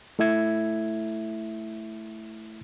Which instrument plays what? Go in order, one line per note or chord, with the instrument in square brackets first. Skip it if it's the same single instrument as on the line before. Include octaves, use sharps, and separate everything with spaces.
[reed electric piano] A3 E4 E5 G#6